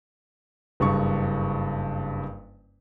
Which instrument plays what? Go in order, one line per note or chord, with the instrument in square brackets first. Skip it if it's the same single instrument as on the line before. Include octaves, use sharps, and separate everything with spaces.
[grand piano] F#1 G2 C#6